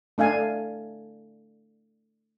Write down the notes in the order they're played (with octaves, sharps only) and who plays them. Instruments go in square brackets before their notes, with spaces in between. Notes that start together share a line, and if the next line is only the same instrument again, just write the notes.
[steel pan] A3 D4 F5 G#5